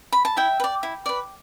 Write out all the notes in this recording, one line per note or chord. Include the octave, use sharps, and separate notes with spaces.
B5
A5
E4 E5 G5
B4
D5
E4
B4 D5